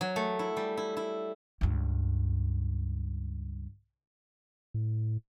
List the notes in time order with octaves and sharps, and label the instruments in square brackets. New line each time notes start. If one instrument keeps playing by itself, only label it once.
[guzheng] F#3
A3
E4
G3
E4
E4
[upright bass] C#2 G2
[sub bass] A2